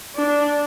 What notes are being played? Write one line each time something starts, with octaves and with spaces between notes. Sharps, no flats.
D4